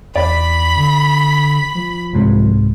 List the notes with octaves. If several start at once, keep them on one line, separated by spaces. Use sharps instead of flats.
E2 D5 B5 B6
D3
F3
C2 G#2 C3